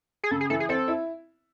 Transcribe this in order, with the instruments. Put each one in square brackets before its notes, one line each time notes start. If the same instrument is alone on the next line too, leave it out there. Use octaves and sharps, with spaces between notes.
[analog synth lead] G#4
[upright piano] C#3 [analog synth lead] A4
[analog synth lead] G#4
[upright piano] E3 [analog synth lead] A4
[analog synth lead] G#4
[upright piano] C4 [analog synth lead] A4
[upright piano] E4